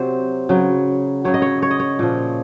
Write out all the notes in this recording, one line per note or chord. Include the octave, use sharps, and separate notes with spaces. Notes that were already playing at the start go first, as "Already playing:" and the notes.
Already playing: C3 F#3 C5
C#3 F#3
C#3 F#3 C#5
D#5
C#5
C#5
D#5
C#5
A#2 F3